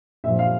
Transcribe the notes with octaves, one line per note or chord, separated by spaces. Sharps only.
A#2 F3 E5
F5